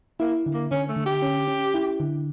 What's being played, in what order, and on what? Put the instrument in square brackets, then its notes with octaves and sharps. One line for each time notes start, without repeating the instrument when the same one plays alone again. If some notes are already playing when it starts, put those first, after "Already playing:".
[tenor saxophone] A#3 [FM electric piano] E4
[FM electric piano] D3
[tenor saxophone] A#3
[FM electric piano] D3 [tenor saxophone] C#4
[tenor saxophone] A3
[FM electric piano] D3
[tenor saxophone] G4
[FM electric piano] C#4
C#4
E4
D3